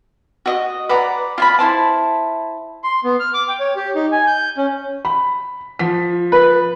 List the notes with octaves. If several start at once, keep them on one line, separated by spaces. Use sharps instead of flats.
F#4 D#5 D#6
B4 D5 F#5 A#5
F4 G#5 B5
E4 F4 C5 A5
C6
B3
F6
D6
G5
C#5
G4
D#4
G#5
G6
C#4
B5
F3 B6
B4